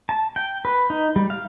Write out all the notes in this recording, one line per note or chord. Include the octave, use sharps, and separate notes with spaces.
A5
G5
B4
D#4
G3
F5